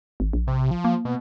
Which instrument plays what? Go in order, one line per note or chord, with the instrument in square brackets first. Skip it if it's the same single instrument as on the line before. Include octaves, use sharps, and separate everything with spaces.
[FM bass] G#1
A#1
[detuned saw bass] C3
F3
[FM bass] A#3
[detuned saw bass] B2